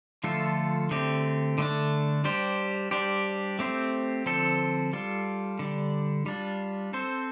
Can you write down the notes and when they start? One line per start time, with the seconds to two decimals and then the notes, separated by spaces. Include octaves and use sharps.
0.24 D3 F3 A3 F4 A4
0.91 D3 A3 C4 G4
1.58 D3 A3 D4
2.24 G3 D4 G4 C5
2.91 G3 D4 G4 C5
3.59 A3 C4 G4 C5
4.26 D3 F3 C4 A4 C5
4.93 G3 F4 A4
5.59 D3 G3 D4
6.26 G3 D4 F4
6.93 C4 A4 C5